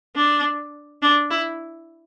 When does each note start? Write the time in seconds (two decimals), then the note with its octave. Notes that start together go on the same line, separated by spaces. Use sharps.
0.16 D4
1.02 D4
1.30 E4